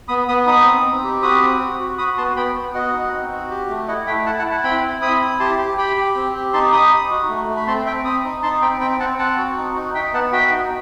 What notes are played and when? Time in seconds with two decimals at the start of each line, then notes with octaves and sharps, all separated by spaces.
0.08 B3 B5 D#6
0.28 B3 B5 D#6
0.47 D#4 B5 D#6
0.65 C4
0.85 C4
1.04 G4
1.23 F#4 B5 D#6
1.42 C4
1.61 F#4
1.80 F#4
1.98 F#4 B5 D#6
2.18 B3 A5 C6
2.36 B3 G5 B5
2.56 B3
2.74 F#4 D#5 F#5
2.93 D#4
3.13 C4
3.32 F#4
3.50 G4
3.69 A3
3.88 E4 D#5 F#5
4.07 A3 E5 G5
4.26 E4 F#5 A5
4.39 F#5 A5
4.45 E4
4.51 F#5 A5
4.63 C4 G5 B5
4.83 E4
5.01 C4 B5 D#6
5.21 E4
5.39 G4 A5 C6
5.59 G4
5.77 G4 G5 B5
5.97 G4
6.15 C4
6.34 G4
6.53 D#4 A5 C6
6.72 D#4 B5 D#6
6.91 D#4
7.10 F#4
7.29 A3
7.48 A3
7.56 B5
7.67 C4 A5 C6
7.86 C4 E5 G5
8.05 C4 B5 D#6
8.25 D#4
8.42 D#4 A5 C6
8.62 C4 G5 B5
8.80 C4 G5 B5
9.00 C4 F#5 A5
9.19 C4 F#5 A5
9.38 F#4
9.57 D#4
9.75 D#4
9.95 D#4 E5 G5
10.13 B3 F#5 A5
10.32 F#4 E5 G5
10.51 D#4